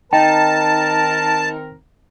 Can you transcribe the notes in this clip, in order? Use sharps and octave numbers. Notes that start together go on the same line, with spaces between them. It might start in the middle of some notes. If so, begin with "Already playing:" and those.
D#3 C4 D#4 A#4 G5 A5